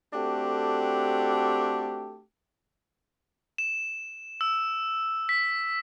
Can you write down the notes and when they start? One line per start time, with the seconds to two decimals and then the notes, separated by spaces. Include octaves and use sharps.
0.13 A3 C4 D4 F#4 G4 A4
3.58 E7
4.41 E6
5.29 B6